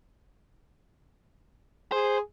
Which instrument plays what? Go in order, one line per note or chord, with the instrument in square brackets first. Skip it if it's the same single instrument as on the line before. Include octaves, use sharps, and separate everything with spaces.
[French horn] G#4 [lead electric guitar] C5